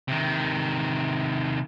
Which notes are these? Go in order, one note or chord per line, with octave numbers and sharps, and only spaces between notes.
C3 D#3